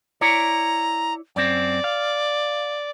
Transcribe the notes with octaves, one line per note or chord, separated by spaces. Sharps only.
E4 C#5 D5 A#5
F#2 C4 D5
F5